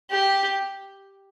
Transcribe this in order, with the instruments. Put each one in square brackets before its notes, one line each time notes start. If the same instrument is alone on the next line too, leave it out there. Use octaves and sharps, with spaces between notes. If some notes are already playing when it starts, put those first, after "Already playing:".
[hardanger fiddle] G4